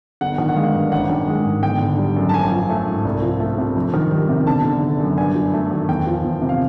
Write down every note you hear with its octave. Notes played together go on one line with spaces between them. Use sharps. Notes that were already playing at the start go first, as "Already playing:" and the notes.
G1 F#5
D#3
F#5
G#3 F5
G2
A1 F#5
D#3
G#3
G#2
G1 G5
D3
G3
F#2
A5
A1 G#5
F3
A3
G#2
C2
F3
A3
C3
F2
D#3
G3
C3
G1 A5
D3
G1
F#2
G2 G#5
F#3
A3
D#3
E2 G5
F3
E2
C3
F5